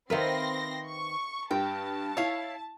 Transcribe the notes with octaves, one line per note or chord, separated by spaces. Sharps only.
D#3 C4 A#4 B4 E5 F5 C6 A#6
C#6
G2 G5 A5
E4 C#5 F5